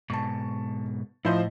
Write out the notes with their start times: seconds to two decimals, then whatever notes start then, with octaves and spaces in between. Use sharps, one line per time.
0.10 G#2 B2 A5 C#6
1.25 A2 F3 E4 C5 D#5